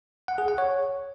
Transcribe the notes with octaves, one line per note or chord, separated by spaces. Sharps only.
F#5
G#4
F#5
C#5